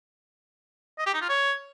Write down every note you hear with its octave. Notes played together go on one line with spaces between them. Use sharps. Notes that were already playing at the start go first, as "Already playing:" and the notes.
D#5
G4
D#4
F4
C#5